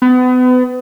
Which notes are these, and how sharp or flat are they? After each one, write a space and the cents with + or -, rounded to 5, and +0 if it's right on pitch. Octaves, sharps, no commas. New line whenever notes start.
B3 +35